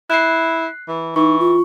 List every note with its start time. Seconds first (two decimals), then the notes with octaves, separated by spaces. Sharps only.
0.10 E4 F#6 C7
0.88 E3
1.16 E3 D#4 C#6
1.40 F4